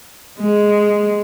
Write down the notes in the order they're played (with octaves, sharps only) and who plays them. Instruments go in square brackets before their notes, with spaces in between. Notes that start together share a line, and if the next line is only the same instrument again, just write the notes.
[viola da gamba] G#3